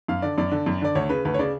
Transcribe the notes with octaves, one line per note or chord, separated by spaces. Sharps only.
F#2 F5
D3 D5
F#2 D5
D3
F#2
D3 D5
D2 C#5
C#3 B4
D2 B4
C#5
C#3 D5